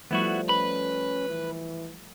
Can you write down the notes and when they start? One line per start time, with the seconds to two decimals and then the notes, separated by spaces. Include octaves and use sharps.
0.11 F3 G3 A3 B3 E4 F#4
0.49 C#4 B4 B5
1.29 E3